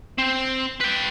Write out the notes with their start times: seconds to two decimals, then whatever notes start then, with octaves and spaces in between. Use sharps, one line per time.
0.18 C4
0.81 B4 G5